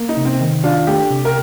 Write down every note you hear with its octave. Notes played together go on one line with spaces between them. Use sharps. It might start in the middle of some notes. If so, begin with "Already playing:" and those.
Already playing: A#3
D#4
C3
C4
D#3
D4 F4
A3 G4
C3
A#4